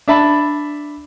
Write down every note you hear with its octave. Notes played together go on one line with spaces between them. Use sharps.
D4 E5 A5 B5